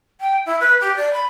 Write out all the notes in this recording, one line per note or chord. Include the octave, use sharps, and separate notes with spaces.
G5
E4
B4
G4
D5
B5